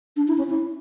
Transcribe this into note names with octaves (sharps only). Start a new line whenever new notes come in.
D4
E4
C#4
E4